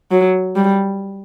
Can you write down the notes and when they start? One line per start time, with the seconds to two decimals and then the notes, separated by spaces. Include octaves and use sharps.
0.11 F#3
0.56 G3